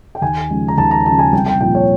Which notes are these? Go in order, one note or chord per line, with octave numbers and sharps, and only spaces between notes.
G5
D#2 G#5
C#3 F3 G#3
A#5
D#2 A5
A#5
C#3 F3 G#3 A5
G#5
C2 G5
G5
A#2 F3 G5
C#5